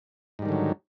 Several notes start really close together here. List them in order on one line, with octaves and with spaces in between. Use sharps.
G#2 G3 D#3 D3 F#3